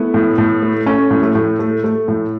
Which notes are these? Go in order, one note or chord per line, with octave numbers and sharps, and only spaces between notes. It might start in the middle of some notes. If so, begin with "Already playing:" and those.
Already playing: A3 B3 E4
A2
A2
A3
A3 C#4
A2
A3
A2
A3
A3
A2